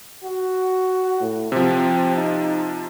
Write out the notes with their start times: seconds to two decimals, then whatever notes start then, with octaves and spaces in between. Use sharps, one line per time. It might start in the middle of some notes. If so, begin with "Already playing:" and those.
0.24 F#4
1.21 A2
1.52 C3 F3 C4
2.16 D#4